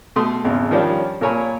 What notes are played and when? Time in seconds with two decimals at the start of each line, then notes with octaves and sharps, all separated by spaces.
0.16 B2 A3 C6 D#6
0.44 G#1 E2 C#3
0.71 D#3 F3 G3 C#4 D4
1.21 A#2 A4 A#4 C#5 G#5 B5